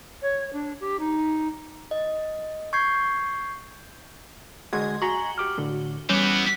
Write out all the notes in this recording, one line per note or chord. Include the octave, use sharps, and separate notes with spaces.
C#5
D4
G4
D#4
D#5
C#6 G6 G#6 C7
D3 G#3 F#4 D#5 C6 G#6
F#4 G#5 A#5 C#6 G7
G4 D6 F6
A2 D3
E3 G3 B3 C#4